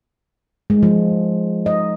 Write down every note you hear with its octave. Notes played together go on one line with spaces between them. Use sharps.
G#3
F3
D#5